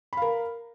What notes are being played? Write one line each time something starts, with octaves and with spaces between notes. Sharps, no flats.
A#4 F5 B5